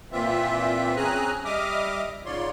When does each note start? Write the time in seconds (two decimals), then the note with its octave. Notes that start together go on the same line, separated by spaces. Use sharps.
0.12 A#2 E3 C4 F4 E5
0.96 C4 C#4 G#4 G#5 A#5 F#6
1.45 G3 D#5 E5 D6 D#6 F6
2.25 G#2 C#3 F4 C#5 D5 C6